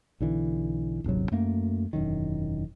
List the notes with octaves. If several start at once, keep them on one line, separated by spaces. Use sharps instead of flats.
B1 D3 E3
D#1 G#1 C3 F#3
F#2 A3 A#3
E1 F#2 D#3